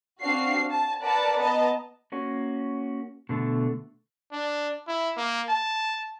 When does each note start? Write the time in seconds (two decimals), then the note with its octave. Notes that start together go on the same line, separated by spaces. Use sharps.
0.22 C4 D4 F#4 F5 C7
0.71 A5
1.02 A#4 B4 D5 F#5 A5 A#5
1.40 B3 D#5 A5 A#5
2.12 A#3 C#4 F#4
3.29 B2 D3 A3
4.32 D4
4.88 E4
5.17 A#3
5.49 A5